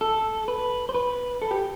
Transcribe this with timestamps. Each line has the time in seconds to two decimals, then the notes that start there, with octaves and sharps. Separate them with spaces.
0.01 A4
0.48 B4
0.89 C5
0.94 B4
1.42 A4
1.51 G4